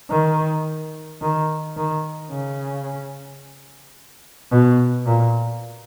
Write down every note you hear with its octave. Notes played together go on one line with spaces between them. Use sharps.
D#3
D#3
D#3
C#3
B2
A#2